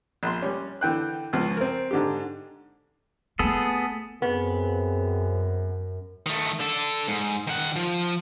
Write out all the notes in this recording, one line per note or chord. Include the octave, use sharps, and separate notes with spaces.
A#1 C6
G3 C#4
D3 E3 G5 F#6
C#2 F3
C4 A#4
G#2 D3 G4
A3 B3 C4 G#4 A4
F#2 B3 C4 G#4
D#3 A3
D4 A4
G#2
D#3 F#5
F3